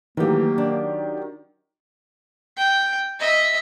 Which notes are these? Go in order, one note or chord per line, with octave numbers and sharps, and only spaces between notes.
D#3 E3 F#3 A3 A#3 G4
D4
G5
D#5 E5